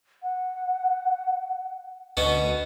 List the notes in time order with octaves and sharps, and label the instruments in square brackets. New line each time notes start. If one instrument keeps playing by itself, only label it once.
[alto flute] F#5
[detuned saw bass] D2 [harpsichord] B2 B3 C#4